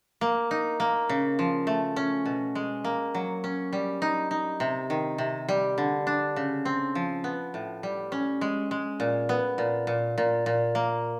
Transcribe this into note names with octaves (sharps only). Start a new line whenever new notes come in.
A#3
D#4
A#3
C#3
F3
A3
C#4
B2
G#3
A#3
F#3
C#4
G3
D#4
D#4
C3
D#3
C3
G3
D3
D4
C#3
C4
F3
B3
A2
G3
C#4
G#3
G#3
A#2
B3
A#2
A#2
A#2
A#2
A#3